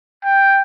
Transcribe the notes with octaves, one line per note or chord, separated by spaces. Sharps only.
G5